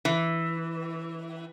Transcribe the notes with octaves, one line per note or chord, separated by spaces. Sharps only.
E3